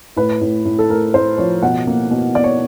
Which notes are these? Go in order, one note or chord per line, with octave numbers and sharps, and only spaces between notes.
A2 B4
A2
A2
A4
A3 A#4
A2 C5
F3 C#5
B2 F#5
A#3
B2
B2 D5
C#5